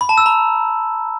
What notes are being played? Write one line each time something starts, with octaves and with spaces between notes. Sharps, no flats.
B5
A5
E6
A#5